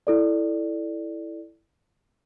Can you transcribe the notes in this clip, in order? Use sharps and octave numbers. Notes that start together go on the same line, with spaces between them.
E4 A4 D5